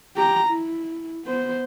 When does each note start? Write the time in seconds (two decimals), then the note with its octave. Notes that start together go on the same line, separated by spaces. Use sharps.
0.16 G4 A#5
0.49 E4
1.25 B3 C5